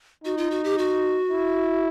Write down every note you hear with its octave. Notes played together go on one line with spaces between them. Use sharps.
D#4 F#4
F4
F#4
G4
F#4
E4